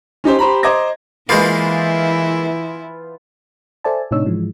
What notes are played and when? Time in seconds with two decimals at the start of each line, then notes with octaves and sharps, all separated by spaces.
0.24 C#4 D#4 G4 C5
0.39 G4 C5 A#5 B5
0.63 C5 D#5 A#5 D6 G#6 A#6
1.29 E3 G#3 A#3 B3 E4 F4 C5
3.84 A4 C5 D5 E5 G#5 A5
4.11 A2 C3 D4 D#4 C#5 E6
4.25 G#2 E3 F3 G#3